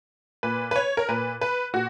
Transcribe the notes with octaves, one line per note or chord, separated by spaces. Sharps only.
A#2 B4
B4
C#5
A#4
A#2 B4
B4
A#2 F#4